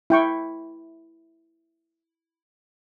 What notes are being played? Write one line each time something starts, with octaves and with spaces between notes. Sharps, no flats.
E4 G5 C#6